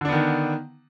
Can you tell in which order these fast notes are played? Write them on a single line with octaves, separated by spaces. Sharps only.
D3 D4 B3 D#3